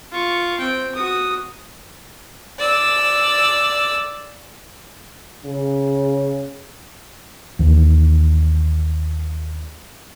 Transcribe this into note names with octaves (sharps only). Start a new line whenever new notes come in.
F4 C#6
C4 G5
F#4 D#6
D5 E6
C#3
D#2 E3